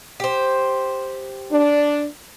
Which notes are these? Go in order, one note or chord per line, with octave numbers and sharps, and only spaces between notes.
G4 C5
D4